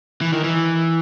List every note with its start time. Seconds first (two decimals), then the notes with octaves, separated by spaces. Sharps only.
0.21 E3
0.33 D#3
0.44 E3